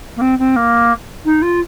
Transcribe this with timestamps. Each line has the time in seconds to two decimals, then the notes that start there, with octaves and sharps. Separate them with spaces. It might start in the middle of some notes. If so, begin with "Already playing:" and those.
0.16 A#3
0.21 C4
0.39 C4
0.56 A#3
1.25 D#4
1.42 F4